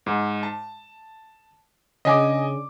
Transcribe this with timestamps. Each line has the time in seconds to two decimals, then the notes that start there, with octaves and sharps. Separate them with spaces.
0.06 G#2
0.43 A5
2.05 C#3 D4 D#5 G#5 D6